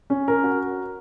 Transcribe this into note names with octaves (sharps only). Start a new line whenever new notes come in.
C#4
A#4
F#4